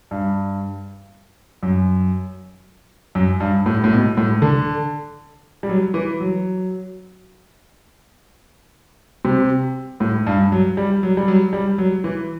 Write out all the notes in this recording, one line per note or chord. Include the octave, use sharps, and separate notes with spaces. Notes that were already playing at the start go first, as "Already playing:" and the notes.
G2
F#2
F#2
G2
A2
A2
B2
A2
D3
G3
F#3
E3
F#3
C3
A2
G2
F#3
G3
F#3
G3
F#3
G3
F#3
E3